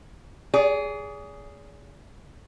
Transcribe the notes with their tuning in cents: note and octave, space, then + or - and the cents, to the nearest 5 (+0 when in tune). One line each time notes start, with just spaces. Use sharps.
G#4 +0 D5 -45